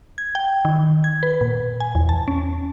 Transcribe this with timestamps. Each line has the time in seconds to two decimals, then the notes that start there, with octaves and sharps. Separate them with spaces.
0.18 G#6
0.35 G5
0.65 D#3
1.04 G#6
1.23 B4
1.41 A#2
1.80 G#5
1.95 E2
2.09 A5
2.28 C#4